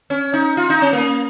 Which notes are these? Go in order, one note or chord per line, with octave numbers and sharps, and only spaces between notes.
C#4
D#4
F4
D#4
C#4
A#3